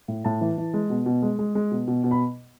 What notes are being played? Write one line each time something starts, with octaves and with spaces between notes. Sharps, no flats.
A2
A2 A5
E3
E3
G#3
B2
B2
G#3
G#3
G#3
B2
B2
B2
B5